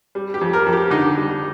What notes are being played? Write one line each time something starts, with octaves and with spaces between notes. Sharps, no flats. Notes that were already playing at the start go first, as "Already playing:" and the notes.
G3
G4
F2
A#4
F2
G4
D3 D#4
G3